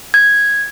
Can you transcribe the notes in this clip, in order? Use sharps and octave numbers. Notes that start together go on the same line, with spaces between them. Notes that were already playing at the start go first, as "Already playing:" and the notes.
G#6